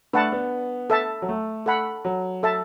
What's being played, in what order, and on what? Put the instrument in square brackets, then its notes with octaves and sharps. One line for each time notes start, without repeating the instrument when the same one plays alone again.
[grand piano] A3 [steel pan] D4 B4 F#5 A5
[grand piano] B3
[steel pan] A4 E5 A5
[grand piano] F#3
A3
[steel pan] A4 F#5 B5
[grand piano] F#3
[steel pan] A4 E5 A5